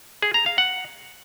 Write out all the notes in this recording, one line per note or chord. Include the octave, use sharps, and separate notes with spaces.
G#4
A#5
F5
F#5